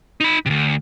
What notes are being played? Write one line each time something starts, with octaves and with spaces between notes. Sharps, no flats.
D#4 B5
D2 C3